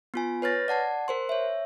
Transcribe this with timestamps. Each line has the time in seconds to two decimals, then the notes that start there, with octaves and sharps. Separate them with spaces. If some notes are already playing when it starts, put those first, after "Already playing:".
0.14 B3 F4 G#5
0.42 B4 C#5 F6 A6 A#6
0.68 D5 F#5 A5 G#6
1.08 A#4 C5 C6
1.29 C#5 E5